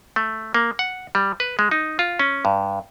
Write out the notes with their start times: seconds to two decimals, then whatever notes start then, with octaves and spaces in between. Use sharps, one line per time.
0.16 A3
0.54 A#3
0.79 F#5
1.15 G3
1.40 B4
1.59 G#3
1.71 D#4
1.99 F4
2.19 C#4
2.45 G2